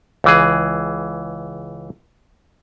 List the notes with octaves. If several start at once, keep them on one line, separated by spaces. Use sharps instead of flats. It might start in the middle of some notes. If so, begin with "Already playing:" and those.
C#2 E3 G#4